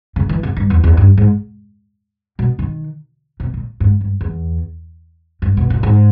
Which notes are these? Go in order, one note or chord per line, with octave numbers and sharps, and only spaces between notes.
C#3
E3
C#3
G2
E2
E2
G2
G#2
B2
D#3
B2
A#2
G#2
G2
E2
G2
B2
A#2
G#2